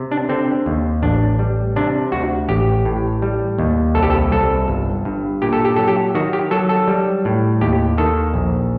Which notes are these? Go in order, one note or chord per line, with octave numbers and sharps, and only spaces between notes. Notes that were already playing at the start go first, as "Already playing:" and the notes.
Already playing: C3
D4
D3 C4
D#2
A1 D4
G3
C3 D4
D2 F#4
A1 G4
A2
G3
D#2
C2 A4
G4
A4
C2 A4
G1
G2
A#2 G4
A4
G4
F#3 A4
G4
D#3 F#4
G4
F#3 A4
A4
G3
A2
D#2 G4
D#3 A4
A#1